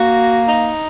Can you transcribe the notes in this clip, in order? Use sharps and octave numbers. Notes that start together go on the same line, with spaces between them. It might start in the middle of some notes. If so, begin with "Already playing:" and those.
Already playing: A#3 F#4
D#4